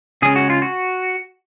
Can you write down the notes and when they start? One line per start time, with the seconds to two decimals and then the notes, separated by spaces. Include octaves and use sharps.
0.22 C#3 G#3 C#4 G#4
0.36 F#4
0.50 F4
0.62 F#4